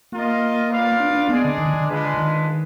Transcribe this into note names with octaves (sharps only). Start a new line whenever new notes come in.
A#3 F4 A#4 D#5
F4 B4 D5 F5
D4
D4
G#3 B3 D4 G#4 D5
D3
D#3
D3
D3
G#3 D4 F4 B4
D#3